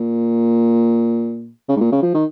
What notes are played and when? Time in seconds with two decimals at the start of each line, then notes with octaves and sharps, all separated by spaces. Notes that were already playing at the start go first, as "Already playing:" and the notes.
Already playing: A#2
1.69 C#3
1.76 G#2
1.81 A#2
1.92 C#3
2.03 F3
2.14 D#3